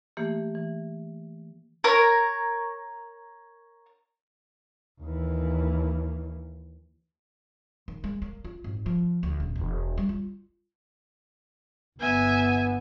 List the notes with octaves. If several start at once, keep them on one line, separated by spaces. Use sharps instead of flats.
E3 A3 A#3 G4
E3
A#4 C#5 A#5
D#2 E3
D#3
G#3
A#3
F4
G#1
F3
D2
D#1
E1
G3
F4
G1 B3 E5 G#5